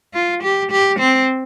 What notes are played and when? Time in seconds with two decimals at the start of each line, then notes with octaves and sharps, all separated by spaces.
0.14 F4
0.43 G4
0.71 G4
0.99 C4